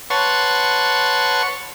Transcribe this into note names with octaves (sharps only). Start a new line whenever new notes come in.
B4 C#5 F#5 A5 C6 C#6